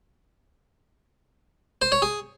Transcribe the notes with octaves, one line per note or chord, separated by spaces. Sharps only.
C5
C#5
G#4